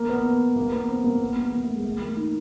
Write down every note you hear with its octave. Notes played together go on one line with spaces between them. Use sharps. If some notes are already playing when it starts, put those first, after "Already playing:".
Already playing: A#3
B3
B3
A#3
B3
C4
A#3
B3
A#3
A#3
A3
G#3
A3
A#3
D#4